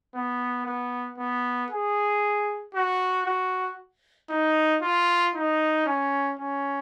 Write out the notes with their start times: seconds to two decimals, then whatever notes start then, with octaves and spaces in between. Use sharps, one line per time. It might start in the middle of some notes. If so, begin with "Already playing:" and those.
0.15 B3
0.66 B3
1.18 B3
1.70 G#4
2.74 F#4
3.26 F#4
4.30 D#4
4.82 F4
5.34 D#4
5.86 C#4
6.39 C#4